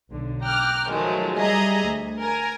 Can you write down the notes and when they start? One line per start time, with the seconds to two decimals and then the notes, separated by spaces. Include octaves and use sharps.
0.10 B1 D3
0.45 G5 A#5 D6 F6 F#6
0.91 D#3 F3 F#3 G#3 A3
1.38 G3 G#4 D#5 E5 A#5
1.88 D2
2.21 A#4 G#5 A#5